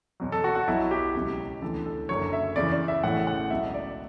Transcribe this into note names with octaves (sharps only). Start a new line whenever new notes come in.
E2 B2 F#3
A4
F#4
F#4
B1 B2 F#3 E4
G4
C#2 B2 F#3
D2 C#3 E3 A4
A4
F#1 F#2 D3 F#3 C#5
E5
E2 C#3 E3 D5
D5
E5
A1 A2 E3 F#5
F#5
C#2 B2 F#3 E5
D5